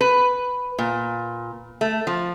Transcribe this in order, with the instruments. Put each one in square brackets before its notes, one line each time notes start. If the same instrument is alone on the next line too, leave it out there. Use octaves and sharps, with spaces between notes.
[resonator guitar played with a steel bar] B4
A#2
A3
F3